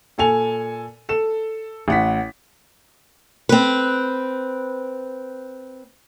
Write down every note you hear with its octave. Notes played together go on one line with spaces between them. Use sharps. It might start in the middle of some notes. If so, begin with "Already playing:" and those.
A#2 A4 G#5 F7
A4 E7
A1 F#5 B6
C4 B4